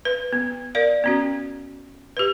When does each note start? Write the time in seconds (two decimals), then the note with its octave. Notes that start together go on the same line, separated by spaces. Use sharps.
0.05 B4
0.33 B3
0.75 A#4 D5 F5
1.04 B3 C#4 F#4
2.17 G4 B4